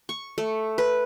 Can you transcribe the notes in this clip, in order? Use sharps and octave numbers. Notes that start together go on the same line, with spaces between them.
C#6
A3
B4